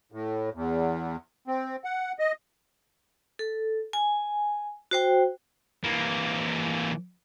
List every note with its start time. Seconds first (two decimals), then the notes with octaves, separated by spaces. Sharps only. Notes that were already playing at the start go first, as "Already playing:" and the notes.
0.12 A2
0.54 E2
1.48 C4
1.84 F#5
2.19 D#5
3.39 A4
3.93 G#5
4.91 F#4 C5 G5
5.84 E3 A#3